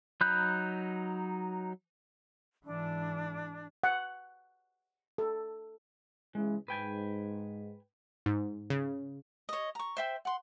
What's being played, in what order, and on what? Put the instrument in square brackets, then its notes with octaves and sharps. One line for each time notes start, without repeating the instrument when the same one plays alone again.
[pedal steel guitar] F#3 D#4 B5 F#6 G6
[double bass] G#2 E3 [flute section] D4
[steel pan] F#5
A4
[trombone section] C#3 E3 [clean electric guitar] G#3
[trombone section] G#2 [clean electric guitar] B4 G5 G#5
[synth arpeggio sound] G#2
C#3
[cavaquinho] C#5 D#5
A#5 C#6
C5 E5 G5
F#5 C6